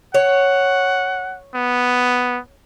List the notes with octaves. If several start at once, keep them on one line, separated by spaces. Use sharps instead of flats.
C#5 F#5
B3